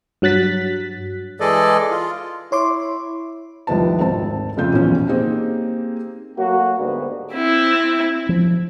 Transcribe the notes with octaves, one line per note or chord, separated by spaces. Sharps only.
G2 F#3 F#6 A6 B6
E3 G#3 G#4 A4 D5 D#5
F4
E4 C#5 C6 D6
F1 C2 D#3 F3 B4 A5
G#1 D2 C4 A5
F2 C#3 A3 F4 G6
D#1 B1 E3 F3 C#4
A#3 C4 D#4 G4 G#4
F#3 A3 A#3 F#4
D2 G#2 D3 G3 A#3 B3
C4 E4
F3